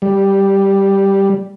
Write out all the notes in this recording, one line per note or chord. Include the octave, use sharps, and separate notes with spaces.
G3